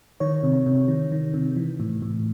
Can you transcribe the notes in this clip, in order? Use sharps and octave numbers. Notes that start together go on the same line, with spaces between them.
D#3 C#5
C3
C3
D#3
D#3
C3
E3
A2
A2